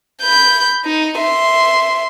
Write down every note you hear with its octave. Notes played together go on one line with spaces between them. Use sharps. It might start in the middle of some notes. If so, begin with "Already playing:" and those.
B5 G6
D#4
E5 C6